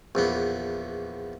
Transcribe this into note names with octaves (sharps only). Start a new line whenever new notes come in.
A#1 E2 B3